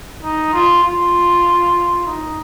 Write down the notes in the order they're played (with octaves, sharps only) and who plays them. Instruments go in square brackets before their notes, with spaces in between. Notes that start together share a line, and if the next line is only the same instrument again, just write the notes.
[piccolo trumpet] D#4
F4
F4
D#4